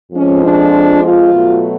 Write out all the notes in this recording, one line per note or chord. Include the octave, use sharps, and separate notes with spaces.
F2 F3 G#3 C#4
D4
F4
B2 F#3 A3